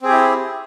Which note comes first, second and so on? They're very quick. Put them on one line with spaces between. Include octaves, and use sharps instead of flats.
C4 G#4 G4 E4